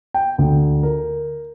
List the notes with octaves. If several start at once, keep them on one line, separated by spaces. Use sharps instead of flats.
G5
D2
A#4